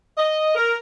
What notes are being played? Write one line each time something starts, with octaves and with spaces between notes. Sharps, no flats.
D#5
A#4